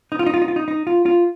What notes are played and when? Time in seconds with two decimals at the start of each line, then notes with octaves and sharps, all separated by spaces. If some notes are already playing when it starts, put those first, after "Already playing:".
0.12 D#4
0.19 F4
0.26 D#4
0.34 F4
0.42 D#4
0.48 F4
0.56 D#4
0.68 D#4
0.87 F4
1.06 F4